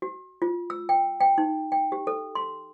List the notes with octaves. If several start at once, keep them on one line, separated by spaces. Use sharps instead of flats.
F#4
F4
E6
G5
G5
D#4
G5
G4
A4
C6